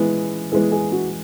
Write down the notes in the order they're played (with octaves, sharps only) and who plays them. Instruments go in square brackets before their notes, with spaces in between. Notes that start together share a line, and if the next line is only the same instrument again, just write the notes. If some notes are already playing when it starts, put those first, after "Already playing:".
Already playing: [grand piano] E3 G#3 B3
[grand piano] E3 G#3 B3 [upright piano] G#4
[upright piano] G#4
F#4